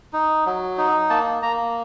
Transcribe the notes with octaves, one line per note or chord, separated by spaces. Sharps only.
D#4
F#3
D#4
A#3 A5
A#3 A#5